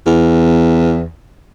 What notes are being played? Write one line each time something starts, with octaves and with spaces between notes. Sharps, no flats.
E2